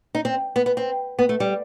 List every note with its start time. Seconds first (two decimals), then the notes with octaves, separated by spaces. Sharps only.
0.15 D#4
0.25 C4
0.56 B3
0.66 B3
0.77 C4
1.19 B3
1.29 A3
1.40 G3